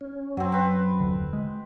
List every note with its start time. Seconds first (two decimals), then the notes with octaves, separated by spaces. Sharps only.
0.01 C#4
0.37 F#2 F#3 C4
0.52 C4 B4
1.00 D#1 D3
1.33 G#3